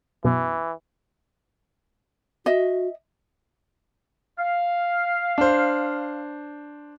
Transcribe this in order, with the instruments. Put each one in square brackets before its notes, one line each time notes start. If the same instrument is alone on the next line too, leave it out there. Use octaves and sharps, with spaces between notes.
[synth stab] F#2 B2 [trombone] E3
[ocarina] F#4 [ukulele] D#5 E5
[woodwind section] F5
[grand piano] D4 C5